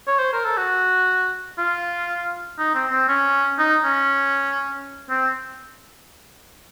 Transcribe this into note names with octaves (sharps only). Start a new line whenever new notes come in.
C#5
C5
A#4
A4
F#4
F4
D#4
C4
C4
C#4
D#4
C#4
C4